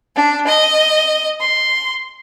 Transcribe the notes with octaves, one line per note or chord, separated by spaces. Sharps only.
D4
D#5
C6